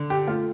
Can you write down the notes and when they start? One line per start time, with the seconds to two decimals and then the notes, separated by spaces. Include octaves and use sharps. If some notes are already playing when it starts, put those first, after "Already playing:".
Already playing: D3
0.10 G4
0.27 A3 F4